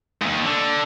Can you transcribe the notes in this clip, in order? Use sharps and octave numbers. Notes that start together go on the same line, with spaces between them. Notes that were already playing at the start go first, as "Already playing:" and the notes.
D#2 G#2
D3